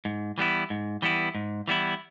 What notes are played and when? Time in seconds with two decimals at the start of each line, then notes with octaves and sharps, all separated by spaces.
0.05 G#2
0.38 E3 G3 B3 E4
0.70 G#2
1.02 E3 G3 B3 E4
1.35 G#2
1.68 E3 G3 B3 E4